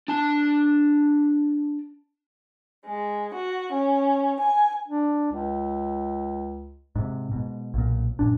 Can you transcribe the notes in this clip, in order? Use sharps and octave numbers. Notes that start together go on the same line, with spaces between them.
D4 A5
G#3
F#4
C#4
G#5
D4
C#2
G#2 C3
G#2 B2
B1 A#2
F#2 A#2 D4